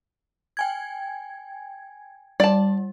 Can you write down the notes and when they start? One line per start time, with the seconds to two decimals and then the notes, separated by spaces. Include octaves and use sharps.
0.57 G5 G#5 G#6
2.40 G3 D5 A5